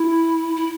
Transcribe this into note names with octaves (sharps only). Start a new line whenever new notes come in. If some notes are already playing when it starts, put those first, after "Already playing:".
Already playing: E4
E4